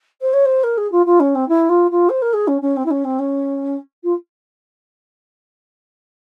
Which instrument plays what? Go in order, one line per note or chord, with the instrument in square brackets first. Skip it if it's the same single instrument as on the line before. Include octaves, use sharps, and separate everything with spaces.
[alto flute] C5
C#5
C5
A#4
G#4
F4
F4
C#4
C4
E4
F4
F4
C5
A#4
G#4
C#4
C#4
C4
E4
C#4
C4
C#4
F4